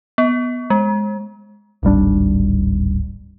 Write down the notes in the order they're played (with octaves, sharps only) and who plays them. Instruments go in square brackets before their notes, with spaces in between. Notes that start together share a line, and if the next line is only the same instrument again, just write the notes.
[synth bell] B3
G#3
[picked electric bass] D1 G#1 G3 D4